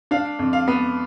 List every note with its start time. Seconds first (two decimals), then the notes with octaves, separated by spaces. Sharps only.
0.11 D4 F5
0.39 F2
0.53 F5
0.68 B3